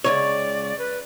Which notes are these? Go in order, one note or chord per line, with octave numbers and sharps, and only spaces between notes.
C#2 B2 C#5 D5
B4